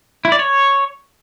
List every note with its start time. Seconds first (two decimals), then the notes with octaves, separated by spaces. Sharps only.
0.25 E4
0.32 D5
0.39 C#5